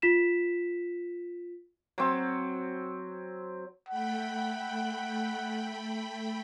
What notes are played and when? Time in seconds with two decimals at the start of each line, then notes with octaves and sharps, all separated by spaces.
0.02 F4 B6 E7
1.98 F#3 C4
3.89 A3 F#5 G5 B5